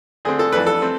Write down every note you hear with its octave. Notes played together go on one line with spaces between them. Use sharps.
D3 A3 C4 G#4
A4
F2 E3 A3 D4 B4
A4
A3 C4